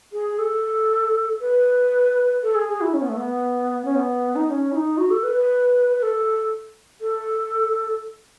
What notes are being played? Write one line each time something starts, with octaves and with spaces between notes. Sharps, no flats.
G#4
A4
B4
A4
G#4
G#4
E4
C#4
B3
A3
B3
C#4
B3
D#4
D#4
C#4
E4
D#4
F#4
A4
B4
B4
B4
A4
A4